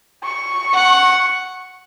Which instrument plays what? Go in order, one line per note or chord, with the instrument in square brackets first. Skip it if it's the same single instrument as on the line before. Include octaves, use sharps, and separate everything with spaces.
[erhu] C#6
[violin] F#5